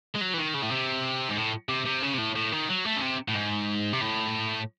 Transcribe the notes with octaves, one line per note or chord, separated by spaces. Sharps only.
G#3
F#3
E3
D#3
C#3
A2
C3
G#2
A2
C3
C3
C#3
C3
A2
A2
D#3
F#3
A3
C#3
C3
A2
G#2
C3
A2